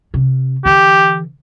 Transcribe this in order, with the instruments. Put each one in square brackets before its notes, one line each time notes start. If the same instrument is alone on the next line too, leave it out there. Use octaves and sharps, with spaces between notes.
[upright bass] C3 C#4
[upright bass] D3 E3 [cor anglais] G4